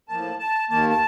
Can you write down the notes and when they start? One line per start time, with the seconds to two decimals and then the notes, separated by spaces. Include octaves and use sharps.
0.08 A2 F3 A#3 A5
0.39 A5
0.70 D#2 D#3 A#3 A5
0.90 A5